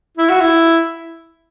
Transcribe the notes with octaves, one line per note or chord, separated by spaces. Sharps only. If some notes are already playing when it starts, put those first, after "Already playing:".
E4
F#4
E4